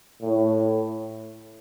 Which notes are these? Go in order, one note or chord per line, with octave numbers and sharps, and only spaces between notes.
A2